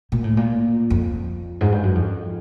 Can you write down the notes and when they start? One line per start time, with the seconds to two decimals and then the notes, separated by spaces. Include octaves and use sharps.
0.12 A#2
0.24 A2
0.37 A#2
0.90 F2
1.61 G#2
1.72 G2
1.83 F#2
1.95 F2